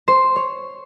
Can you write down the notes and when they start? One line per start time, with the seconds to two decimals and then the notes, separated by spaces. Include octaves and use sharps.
0.08 C5
0.36 C#5